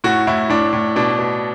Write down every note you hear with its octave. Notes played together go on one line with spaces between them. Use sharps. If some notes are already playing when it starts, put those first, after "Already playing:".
A2 F#4
A2 E4
A2 D4
A2
B2 D4
B2